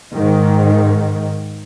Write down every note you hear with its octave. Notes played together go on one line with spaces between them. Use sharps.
G#2 D#3